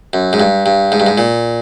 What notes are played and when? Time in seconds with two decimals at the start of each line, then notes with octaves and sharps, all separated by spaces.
0.13 F#2
0.33 G#2
0.40 G2
0.66 G2
0.92 G#2
1.00 G2
1.06 G#2
1.18 A#2